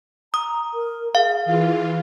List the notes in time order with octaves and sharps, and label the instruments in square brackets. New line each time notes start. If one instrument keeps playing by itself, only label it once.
[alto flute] A#5 [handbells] D#6
[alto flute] A#4
[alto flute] G#4 [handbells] F5
[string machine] E3 F4